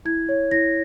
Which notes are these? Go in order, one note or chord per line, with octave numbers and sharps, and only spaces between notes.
E4 G#6
C#5
E4 A#6